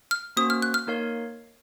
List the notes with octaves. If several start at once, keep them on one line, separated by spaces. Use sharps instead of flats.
F6
A#3 C#4 F#4 C5 D#6
F6
F#6
F6
A#3 D#4 A#4 C#5 F5